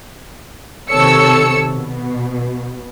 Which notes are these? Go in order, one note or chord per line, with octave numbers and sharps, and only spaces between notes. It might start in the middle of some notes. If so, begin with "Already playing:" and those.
C3 D#3 A4 C#5 E6 C#7
B2